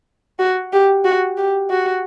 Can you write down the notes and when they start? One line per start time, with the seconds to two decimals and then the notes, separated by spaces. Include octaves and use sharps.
0.39 F#4
0.73 G4
1.05 F#4
1.37 G4
1.70 F#4